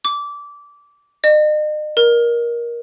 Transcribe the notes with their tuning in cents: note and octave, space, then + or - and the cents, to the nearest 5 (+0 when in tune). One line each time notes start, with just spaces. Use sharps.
D6 -20
D#5 -40
A#4 +20